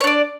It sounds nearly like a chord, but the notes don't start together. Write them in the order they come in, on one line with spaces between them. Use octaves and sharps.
C#5 D4 D5